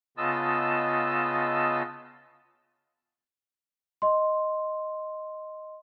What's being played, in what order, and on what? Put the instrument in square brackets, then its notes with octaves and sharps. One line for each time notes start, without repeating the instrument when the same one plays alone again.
[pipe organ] C#3 B3 F4 D#5 A5 E6
[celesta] D#5 C6